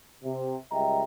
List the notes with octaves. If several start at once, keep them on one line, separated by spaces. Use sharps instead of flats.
C3
C#2 G3 D#5 E5 G5 A#5